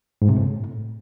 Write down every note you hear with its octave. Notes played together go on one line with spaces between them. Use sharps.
G#2
C3
A2